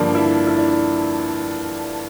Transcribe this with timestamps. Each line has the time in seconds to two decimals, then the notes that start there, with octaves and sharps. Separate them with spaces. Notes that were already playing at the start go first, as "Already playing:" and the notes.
Already playing: G2 D3 F3 A#3 D4
0.15 E4
0.47 E4
0.58 D4